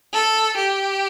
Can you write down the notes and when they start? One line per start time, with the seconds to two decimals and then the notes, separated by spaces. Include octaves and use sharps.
0.13 A4
0.57 G4